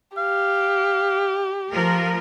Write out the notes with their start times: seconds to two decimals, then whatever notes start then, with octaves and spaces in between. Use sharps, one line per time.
0.17 G4 F5
1.71 F3 A3 A#4